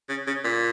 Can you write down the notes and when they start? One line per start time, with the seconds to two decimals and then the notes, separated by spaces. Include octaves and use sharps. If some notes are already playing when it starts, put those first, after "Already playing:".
0.10 C#3
0.27 C#3
0.45 A#2